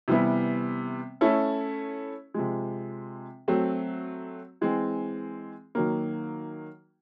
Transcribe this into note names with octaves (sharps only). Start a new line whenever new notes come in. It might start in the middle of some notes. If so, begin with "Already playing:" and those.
C3 E3 G3 B3 E4
A3 C#4 E4 A4
C3 F3 G#3
F#3 A3 C4
E3 G#3 C4
D#3 F#3 A#3